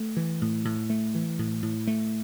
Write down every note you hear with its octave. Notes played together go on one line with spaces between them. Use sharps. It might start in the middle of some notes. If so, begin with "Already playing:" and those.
Already playing: A3
E3
A2
A2
A3
E3
A2
A2
A3